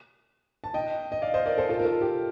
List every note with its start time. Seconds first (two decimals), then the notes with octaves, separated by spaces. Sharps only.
0.64 A5
0.74 D#5 G5
1.12 D#5
1.22 D5 F5
1.34 C5 D#5
1.46 A#4 D5
1.57 A4 C5
1.69 F4 A4
1.79 A#4
1.85 F4 A4
2.01 G4